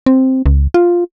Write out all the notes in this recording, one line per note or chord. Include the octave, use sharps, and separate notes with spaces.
C4
C#2
F4